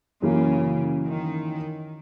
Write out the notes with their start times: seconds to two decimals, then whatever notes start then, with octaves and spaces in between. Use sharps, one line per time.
0.22 F#2 C#3 E3 A#3
1.06 D#3